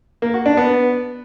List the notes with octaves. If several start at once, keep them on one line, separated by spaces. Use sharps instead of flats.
A#3
F#4
D4
B3